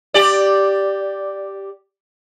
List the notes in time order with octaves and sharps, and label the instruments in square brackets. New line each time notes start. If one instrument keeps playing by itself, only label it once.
[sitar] G4 D5